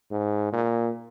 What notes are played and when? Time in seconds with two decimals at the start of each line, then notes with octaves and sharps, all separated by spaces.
0.11 G#2
0.53 A#2